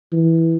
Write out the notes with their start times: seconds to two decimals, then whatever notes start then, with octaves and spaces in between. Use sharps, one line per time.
0.12 E3